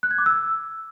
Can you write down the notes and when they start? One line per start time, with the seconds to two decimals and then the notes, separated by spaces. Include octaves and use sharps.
0.03 F#6
0.11 G#6
0.18 D6
0.26 E6